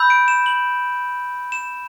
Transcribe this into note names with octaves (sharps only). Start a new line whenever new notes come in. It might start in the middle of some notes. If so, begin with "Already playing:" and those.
Already playing: B5 E6 G6
D7
E7
F#7
E7